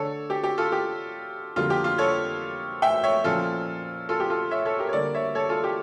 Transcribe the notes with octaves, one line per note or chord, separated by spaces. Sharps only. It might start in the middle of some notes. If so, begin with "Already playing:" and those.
Already playing: D3 A3 D4 A4 C#5
G4
G4
F4 A4
G4
F2 D3 G3 A#3 F4
G4
F4
A4 C#5
E5 G5
C#5 E5
A#2 F3 C#4 F4 A4
F4 A4
G4
F4 A4
C#5 E5
A4 C#5
G4 A#4
C#5
D3 G3 A#3 A#4 D5
C#5 E5
A4 C#5
F4 A4
G4